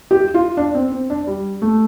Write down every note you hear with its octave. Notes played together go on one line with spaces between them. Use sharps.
G4
F4
D4
C4
C4
D4
G3
A3